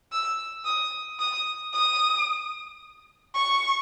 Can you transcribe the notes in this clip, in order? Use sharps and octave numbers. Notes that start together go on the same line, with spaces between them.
E6
D#6
D#6
D#6
C#6